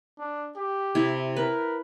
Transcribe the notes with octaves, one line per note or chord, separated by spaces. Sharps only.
D4
G4
C3 E4
A#4 B4